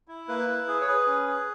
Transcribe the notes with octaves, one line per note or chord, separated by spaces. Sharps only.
E4
A#3 B4
E4
G#4
C#5
G#4 B4
C#4
G#4